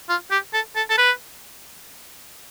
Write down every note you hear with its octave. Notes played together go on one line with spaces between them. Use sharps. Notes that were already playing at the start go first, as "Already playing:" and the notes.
F4
G4
A4
A4
A4
B4